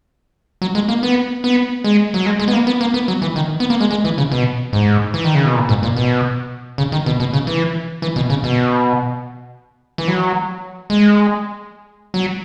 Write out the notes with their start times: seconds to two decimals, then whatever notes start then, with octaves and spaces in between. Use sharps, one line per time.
0.62 F#3
0.75 G#3
0.88 A#3
1.03 B3
1.44 B3
1.84 G#3
2.14 F#3
2.26 G#3
2.40 G#3
2.48 B3
2.53 A#3
2.67 B3
2.81 A#3
2.94 B3
3.08 F#3
3.22 E3
3.36 D#3
3.60 B3
3.70 A#3
3.80 G#3
3.91 G#3
4.04 E3
4.18 C#3
4.32 B2
4.73 G#2
5.14 E3
5.24 D#3
5.35 C#3
5.45 B2
5.55 A#2
5.69 G#2
5.83 A#2
5.96 B2
6.78 C#3
6.92 D#3
7.06 B2
7.20 B2
7.33 C#3
7.47 E3
8.02 E3
8.16 B2
8.30 C#3
8.44 B2
9.98 E3
10.08 F#3
10.90 G#3
12.14 F#3